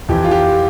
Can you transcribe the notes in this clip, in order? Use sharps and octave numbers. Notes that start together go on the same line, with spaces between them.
F2 E3 G4
F4
G4